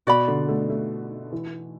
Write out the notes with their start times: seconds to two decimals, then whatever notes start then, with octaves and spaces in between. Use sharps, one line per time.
0.07 B2 F#4 D5 B5
0.28 D3
0.49 A3
0.70 A3
1.32 E3